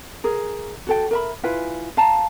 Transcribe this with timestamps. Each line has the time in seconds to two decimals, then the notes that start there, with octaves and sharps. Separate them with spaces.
0.24 G#4 A#4
0.87 F#4 A4 G5
1.11 A#4 E5 B5
1.43 E4 F4 B4 G#5
1.97 F5 A5 A#5